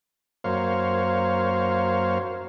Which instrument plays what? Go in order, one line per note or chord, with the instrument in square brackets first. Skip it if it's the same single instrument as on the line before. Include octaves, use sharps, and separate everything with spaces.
[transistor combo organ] F#2 A#3 C5 C#5 F5